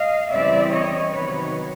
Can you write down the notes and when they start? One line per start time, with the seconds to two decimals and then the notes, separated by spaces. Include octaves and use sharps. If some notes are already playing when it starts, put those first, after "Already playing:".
Already playing: D#5 F5
0.32 C#3 E3 G3 C4 E4 D5 E5
0.72 C#5 D#5
1.12 C3 D#3 F#3 B3 D#4 B4 C#5